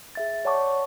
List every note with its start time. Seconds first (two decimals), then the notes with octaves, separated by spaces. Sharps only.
0.15 G#4 E5 A6
0.45 C#5 D5 F#5 A5 C#6 D6